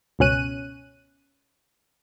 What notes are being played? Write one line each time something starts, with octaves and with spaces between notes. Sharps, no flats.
G1 C#2 B2 C#4 F#6 D#7